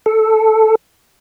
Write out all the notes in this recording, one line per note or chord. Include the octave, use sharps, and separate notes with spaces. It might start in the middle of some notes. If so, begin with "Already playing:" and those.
A4